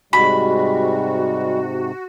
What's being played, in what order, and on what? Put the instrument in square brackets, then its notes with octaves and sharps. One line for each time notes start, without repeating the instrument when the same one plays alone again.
[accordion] G#2 C3 [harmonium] G3 G#3 [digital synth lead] F#4 [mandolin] B5